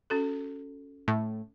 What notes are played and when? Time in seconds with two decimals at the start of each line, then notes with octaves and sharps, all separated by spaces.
0.10 C#4 F#4 A4
1.08 A2